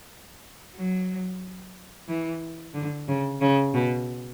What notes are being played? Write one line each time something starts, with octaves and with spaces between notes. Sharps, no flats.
F#3
E3
D3
C#3
C#3
B2